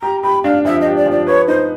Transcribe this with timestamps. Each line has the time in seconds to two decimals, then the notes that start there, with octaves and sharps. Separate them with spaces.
0.02 G4 A#5
0.23 G4 B5
0.44 D4 F5
0.65 F3 E5
0.81 G4 D#5
0.96 D5
1.06 F3
1.11 D5
1.27 B4 C#5
1.48 D#4 C5